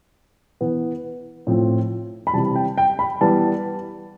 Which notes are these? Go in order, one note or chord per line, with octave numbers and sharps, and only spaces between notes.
E3 B3
A2 F3 C4
B5
C3 E3 G3 A5
G5
G5
B5
E3 G3 B3 A5